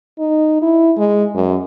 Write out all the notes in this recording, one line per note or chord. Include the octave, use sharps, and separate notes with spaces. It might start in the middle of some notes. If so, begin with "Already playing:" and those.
D#4
E4
G#3
F#2